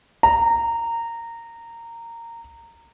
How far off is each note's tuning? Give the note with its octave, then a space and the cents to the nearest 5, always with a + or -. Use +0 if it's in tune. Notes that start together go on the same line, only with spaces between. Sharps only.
A#5 -15